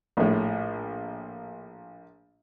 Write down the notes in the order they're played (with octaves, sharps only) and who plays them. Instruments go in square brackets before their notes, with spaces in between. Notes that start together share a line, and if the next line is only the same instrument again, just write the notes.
[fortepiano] A#1 A2